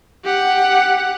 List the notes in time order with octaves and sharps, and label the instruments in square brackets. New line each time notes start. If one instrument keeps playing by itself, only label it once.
[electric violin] G4 F#5